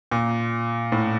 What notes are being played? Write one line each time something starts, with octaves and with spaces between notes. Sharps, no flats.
A#2
A2